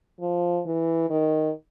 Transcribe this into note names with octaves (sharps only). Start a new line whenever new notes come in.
F3
E3
D#3